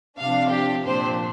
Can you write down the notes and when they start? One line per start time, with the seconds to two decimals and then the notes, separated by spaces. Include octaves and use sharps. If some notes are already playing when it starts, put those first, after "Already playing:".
0.19 C3 F3 D4 F5
0.51 G4
0.84 A#2 F3 D4 C5